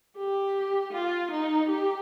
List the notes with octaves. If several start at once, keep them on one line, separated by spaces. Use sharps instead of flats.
G4
F4
D#4
G4